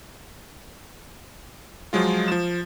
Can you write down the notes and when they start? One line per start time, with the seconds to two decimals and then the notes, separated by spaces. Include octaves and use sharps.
1.93 F3 F#3 G#3 F4
2.28 F3 E7